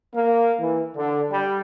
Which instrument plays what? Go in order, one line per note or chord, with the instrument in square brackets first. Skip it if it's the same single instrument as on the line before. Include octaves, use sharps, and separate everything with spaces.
[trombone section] A#3
E3
D3
G3